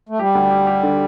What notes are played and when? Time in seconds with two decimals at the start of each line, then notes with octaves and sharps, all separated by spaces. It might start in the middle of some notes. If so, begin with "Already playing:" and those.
0.09 A3
0.19 G3 G4
0.35 D2
0.51 G4
0.67 G4
0.83 D3